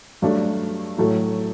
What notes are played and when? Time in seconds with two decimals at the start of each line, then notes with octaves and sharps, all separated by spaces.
0.22 G2 F#3 A3 D4
0.98 A2 F#3 A3